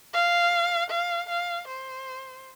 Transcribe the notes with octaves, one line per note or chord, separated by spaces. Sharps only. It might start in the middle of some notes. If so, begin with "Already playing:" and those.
F5
F5
F5
C5